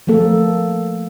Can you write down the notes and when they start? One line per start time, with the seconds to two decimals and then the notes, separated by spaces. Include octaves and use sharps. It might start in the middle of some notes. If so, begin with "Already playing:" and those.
0.07 F3 A3 A#3 A4